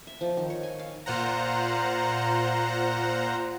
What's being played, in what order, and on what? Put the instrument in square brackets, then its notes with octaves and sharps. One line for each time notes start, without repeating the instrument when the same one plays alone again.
[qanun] E5
F3
D#3
C#5
G#5
F5
[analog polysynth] A#2 F4 C5 F#5 A#5